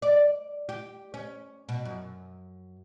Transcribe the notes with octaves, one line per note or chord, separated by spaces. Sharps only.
D5
G4
C#4
B2
F#2